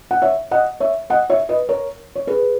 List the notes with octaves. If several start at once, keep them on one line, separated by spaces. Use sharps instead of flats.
F#5
C#5 E5
D#5 F#5
C#5 E5
D#5 F#5
C#5 E5
B4 D#5
A#4 C#5
C#5
G#4 B4